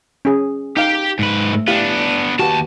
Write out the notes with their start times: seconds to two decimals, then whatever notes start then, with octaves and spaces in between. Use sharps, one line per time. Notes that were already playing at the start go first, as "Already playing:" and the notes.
0.25 C#4 G#4
0.77 D#4 G4 F5 G5
1.19 G#2 B4
1.53 A3
1.68 B3 D4 E4 G4 F5
2.39 D#2 F#4 G4 B4 A5